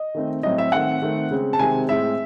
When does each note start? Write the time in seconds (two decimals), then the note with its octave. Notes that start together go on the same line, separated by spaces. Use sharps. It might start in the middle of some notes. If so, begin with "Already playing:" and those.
Already playing: D#5
0.15 D#3 A3 C4
0.43 A2 F#3 C4 D#5
0.58 E5
0.72 D#3 A3 C4 F#5
1.02 D#3 A3 C4
1.31 C#3 G#3 C4
1.53 A5
1.59 C3 D#3 G#3 C4 G#5
1.89 A2 G#3 C4 E5